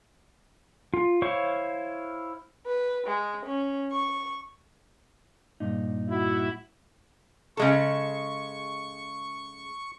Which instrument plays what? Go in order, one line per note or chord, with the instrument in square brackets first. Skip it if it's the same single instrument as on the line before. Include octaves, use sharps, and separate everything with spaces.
[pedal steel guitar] F4
E4 C5 C#5 F5 C#6
[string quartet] B4
G#3
C#4
C#6
[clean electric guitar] G2 A#2 D#4
[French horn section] E4 F#4
[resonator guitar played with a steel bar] C#3 G#3 A4 [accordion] C#6